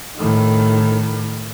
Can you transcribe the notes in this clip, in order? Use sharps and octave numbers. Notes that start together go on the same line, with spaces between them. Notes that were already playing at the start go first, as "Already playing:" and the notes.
A2 D#3